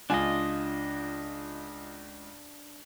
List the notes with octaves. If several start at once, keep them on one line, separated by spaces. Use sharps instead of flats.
C#2 D4 F4 D#5 G#5